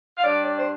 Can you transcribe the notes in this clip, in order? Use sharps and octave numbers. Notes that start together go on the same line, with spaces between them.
F5
G2 G3 D4 D5
D5
C5